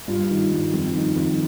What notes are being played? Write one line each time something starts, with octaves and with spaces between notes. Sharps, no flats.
G2 F4
D#3
G2
F2
D#3
F2